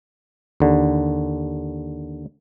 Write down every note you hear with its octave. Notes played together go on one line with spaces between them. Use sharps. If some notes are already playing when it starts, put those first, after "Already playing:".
D#2 D3